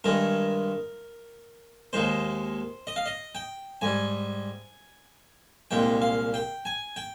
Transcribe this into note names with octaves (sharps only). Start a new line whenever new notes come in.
G2 D#3 G#3 A#4
D#2 D#3 G#3 C5
D#5
F5
D#5
G5
G#2 G3 G#5
C2 A#2 G#3 G5
F5
G5
G#5
G5